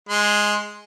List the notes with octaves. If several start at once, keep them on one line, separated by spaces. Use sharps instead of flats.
G#3 C6